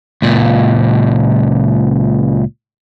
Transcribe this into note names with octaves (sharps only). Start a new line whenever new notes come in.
C#2 A#2